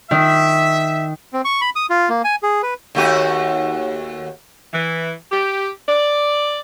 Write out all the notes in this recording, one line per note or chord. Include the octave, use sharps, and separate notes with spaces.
D#3 E5
C4
C#6
B5
D#6
F4
A#3
G#5
G#4
B4
D#2 A3 F#4
E3
G4
D5